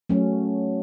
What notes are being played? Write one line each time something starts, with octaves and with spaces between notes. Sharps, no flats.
F#3 A3 C#4